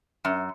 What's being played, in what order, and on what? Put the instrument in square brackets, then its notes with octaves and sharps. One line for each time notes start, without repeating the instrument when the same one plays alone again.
[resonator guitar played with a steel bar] F#2